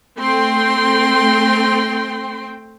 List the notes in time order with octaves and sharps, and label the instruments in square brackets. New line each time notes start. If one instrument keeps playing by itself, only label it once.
[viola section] A3 C4 G5 C6